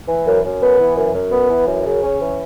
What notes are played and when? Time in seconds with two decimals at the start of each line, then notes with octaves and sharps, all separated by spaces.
0.08 E3
0.26 F#2
0.44 F#2
0.62 B3
0.80 E3
0.97 F#2
1.14 F#2
1.32 B3
1.50 E3
1.67 F#2
1.85 C#3
2.03 C#4
2.21 E3